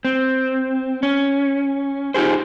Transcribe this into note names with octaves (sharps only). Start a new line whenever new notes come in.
C4
C#4
D#4 F4 G4 G#4 C5